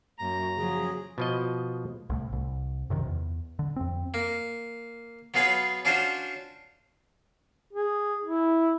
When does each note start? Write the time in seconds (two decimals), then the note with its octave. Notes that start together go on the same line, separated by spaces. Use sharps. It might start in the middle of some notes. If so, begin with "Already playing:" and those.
0.19 F#2 A#3 A#5
0.57 C#3 F3 F#3 G#4
1.18 B2 F3 D#5
2.10 C2 A2
2.33 C2
2.90 F#2 C3 D#3
3.07 E2
3.59 D3
3.76 F2 C4
4.14 A#3
5.34 F#3 B3 F4 G#4 B4 C#5
5.85 C#4 D4 F4 F#4 C5 C#5
7.73 G#4
8.24 E4